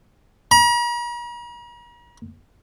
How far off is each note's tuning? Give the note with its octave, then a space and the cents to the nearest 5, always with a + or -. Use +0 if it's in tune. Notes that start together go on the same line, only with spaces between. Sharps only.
A#5 +45